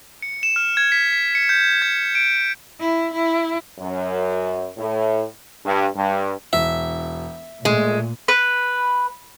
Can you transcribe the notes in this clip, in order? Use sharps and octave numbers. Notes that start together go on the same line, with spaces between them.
C#7
E7
F6
G#6
B6
B6
C#7
G6
G#6
D7
E4
E4
F#2
A2
G2
G2
E1 E5
A#2 G#3 A3
B4